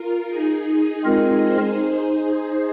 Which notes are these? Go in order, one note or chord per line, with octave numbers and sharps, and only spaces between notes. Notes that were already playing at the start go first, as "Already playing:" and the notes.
Already playing: F4 A#4
D#4 G#4
G#3 C4 D#4 F4 G#4 A#4 D#5
G#4 C5